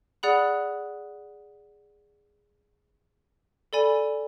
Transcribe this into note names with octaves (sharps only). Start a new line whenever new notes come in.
G#4 D5 F#5 B5 F#6
A4 D5 G#5 B5